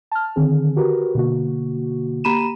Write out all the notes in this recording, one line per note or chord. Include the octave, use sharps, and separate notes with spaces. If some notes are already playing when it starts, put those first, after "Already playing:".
A5 F6
D3 D#3 C4 G#4
F#4 G4 A#4 B4
B2 D3 A#3 F#4
A#3 G4 A#5 B5 D#7 E7